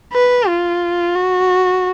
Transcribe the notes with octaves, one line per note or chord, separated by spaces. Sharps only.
B4
F4
F#4